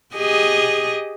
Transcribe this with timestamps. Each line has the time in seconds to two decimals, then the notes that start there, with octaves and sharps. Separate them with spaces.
0.15 G4 G#4 D#5